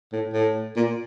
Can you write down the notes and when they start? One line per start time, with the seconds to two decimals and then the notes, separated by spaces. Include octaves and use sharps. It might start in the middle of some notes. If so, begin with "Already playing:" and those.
0.13 A2
0.33 A2
0.76 A#2